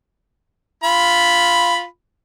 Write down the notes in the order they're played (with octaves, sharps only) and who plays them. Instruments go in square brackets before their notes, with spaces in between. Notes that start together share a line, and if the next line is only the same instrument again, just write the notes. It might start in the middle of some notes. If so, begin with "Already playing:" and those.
[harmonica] F4 B5